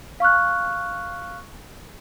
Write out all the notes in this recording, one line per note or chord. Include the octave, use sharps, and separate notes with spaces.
F5 C#6 F6 F#6